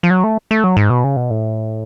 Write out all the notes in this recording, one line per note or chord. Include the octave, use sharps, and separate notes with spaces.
F3
F#3
A3
A3
F#3
G#2
B2
C#3
B2
A2